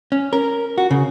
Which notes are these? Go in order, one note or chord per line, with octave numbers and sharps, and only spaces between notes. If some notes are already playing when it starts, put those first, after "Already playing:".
C#4
A#4
F#4
C#3